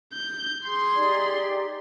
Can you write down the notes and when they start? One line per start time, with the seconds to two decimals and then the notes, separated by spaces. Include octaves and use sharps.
0.13 G6
0.65 G#4 C6
0.96 D#4 G4 D5